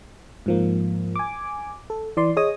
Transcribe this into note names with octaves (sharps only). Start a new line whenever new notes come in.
G#2 F3 A#3
G#5 D6
A4
E3 D5 C6
G#4 C#5 D#5 G#5 D#6